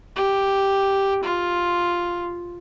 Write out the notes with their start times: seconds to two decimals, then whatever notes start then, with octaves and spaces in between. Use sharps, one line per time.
0.16 G4
1.23 F4